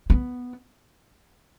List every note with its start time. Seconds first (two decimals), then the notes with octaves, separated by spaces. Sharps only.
0.10 B3